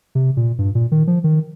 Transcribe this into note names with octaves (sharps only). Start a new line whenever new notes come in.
C3
A#2
G2
A#2
D#3
F3
D#3